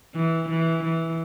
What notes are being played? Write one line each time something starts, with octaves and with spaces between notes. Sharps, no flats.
E3
E3
E3